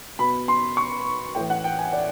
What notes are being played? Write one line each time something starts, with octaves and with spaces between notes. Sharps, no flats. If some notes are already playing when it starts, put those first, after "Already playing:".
B2 B5
C6
C#6
A2 E3 G5
F#5
G5
G#5
D5